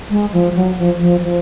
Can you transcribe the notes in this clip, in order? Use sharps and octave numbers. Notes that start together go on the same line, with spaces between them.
G#3
F3
F#3
F3
F3
F3